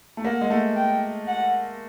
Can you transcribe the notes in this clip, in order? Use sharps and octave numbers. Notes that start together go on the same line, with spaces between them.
A3
A#3 F#5
G#3
A3
G5
F#5